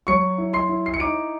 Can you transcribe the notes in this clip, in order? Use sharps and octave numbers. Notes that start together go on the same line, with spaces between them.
F#3 C#6 C#7
E4
C6 C7
E4
C7
C#7
D#4 D6 D7